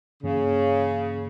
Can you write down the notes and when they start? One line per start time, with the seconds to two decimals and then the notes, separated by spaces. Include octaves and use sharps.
0.23 G2 C#3 E3 A#3